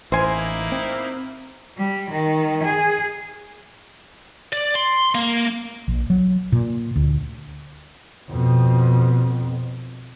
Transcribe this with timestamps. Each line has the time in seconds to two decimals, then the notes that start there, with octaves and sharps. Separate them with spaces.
0.12 A1 A#3 D#4 E4 C5 G#5
0.72 C4
1.77 G3
2.11 D#3
2.64 G#4
4.53 D5
4.75 C6
5.15 A#3
5.88 A#1
6.10 F#3
6.52 A#2
6.96 D2
8.30 F2 B2